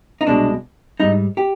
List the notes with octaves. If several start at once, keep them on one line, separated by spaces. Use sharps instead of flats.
D#4
C2 B2 G#3 D4
G#2 G3 D#4
G4